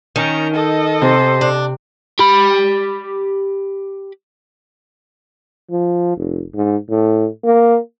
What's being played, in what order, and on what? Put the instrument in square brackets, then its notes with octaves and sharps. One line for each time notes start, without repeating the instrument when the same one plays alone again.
[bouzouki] D#3 [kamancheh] C#4 A#5
[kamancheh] A4 D#5
[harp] C3 [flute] C5
[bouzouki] D4
[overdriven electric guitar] G4 B5
[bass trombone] F3
F1
G#2
A2
A#3